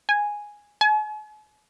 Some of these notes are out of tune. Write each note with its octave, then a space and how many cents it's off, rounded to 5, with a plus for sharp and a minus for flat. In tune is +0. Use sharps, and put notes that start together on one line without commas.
G#5 -5
G#5 +45